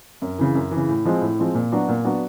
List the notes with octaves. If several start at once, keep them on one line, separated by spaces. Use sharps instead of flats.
F#2
C#3 E3
F#2
E3
C#3
A2
F3 G#3 C4
A2
F3 G#3 C4
A#2
F#3 B3 D4 F#4
A#2
F#3 B3 D4 F#4